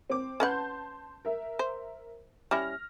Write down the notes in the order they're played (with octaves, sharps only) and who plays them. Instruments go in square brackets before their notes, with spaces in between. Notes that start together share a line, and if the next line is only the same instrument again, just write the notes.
[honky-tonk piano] C4 D6
[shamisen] C#4 B4 F#5 [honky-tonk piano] A5 C6 G6
[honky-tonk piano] A#4 E5
[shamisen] C5
[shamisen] G3 C#4 E4 [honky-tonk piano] F6 A#6